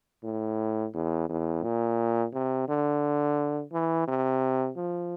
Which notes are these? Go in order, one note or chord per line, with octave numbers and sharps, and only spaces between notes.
A2
E2
E2
A#2
C3
D3
E3
C3
F3